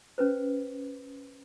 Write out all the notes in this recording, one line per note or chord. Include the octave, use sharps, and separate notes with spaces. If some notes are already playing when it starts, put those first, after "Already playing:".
C#4 B4 C5